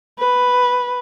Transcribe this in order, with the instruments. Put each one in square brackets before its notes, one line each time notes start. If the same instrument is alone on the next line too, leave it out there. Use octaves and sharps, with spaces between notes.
[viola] B4